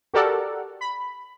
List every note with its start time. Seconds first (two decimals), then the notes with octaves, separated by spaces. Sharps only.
0.14 F#4 G4 A4 A#4 D5 F#5
0.81 B5